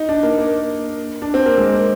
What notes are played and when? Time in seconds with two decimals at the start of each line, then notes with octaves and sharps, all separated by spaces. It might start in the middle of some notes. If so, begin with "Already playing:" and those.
Already playing: D#4
0.09 D4
0.23 A#3
0.38 A#3
1.22 D4
1.34 C4
1.46 A#3
1.58 G#3
1.73 A#3